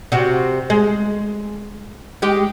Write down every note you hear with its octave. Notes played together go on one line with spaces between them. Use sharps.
C3 F#4
G#3
G#3 G4